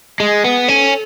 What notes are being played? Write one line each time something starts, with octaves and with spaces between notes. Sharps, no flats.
G#3 G#4
B3
C#4 A4